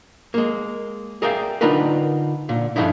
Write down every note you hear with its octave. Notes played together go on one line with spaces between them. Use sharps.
G#3 A#3
G#4 A#4 D5 E5 F5 G5
D3 D4 D#4 F4 A#4 B4
A#2 D3
G2 B2 D3 F3 D#4 E4